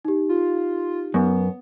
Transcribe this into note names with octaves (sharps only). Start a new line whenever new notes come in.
D#4 G4
F4
F#2 B3